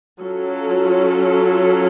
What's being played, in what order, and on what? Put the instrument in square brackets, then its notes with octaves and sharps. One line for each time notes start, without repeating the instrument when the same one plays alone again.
[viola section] F#3 C#4 F4 A4